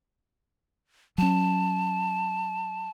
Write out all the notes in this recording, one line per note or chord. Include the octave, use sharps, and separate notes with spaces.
F#3 C#4 A5